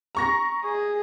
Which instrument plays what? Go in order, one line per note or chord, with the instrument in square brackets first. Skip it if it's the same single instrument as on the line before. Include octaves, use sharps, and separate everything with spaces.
[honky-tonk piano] A#5 C#6 A#6
[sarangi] G#4